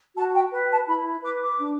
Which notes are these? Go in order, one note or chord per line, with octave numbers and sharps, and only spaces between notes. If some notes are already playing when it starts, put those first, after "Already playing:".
F#4 A5
G5
B4
A5
E4 B5
B4 D6
D6
D4